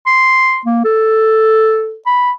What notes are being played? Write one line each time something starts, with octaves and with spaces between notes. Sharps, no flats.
C6
A#3
A4
B5